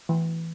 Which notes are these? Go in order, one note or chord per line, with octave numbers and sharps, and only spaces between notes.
E3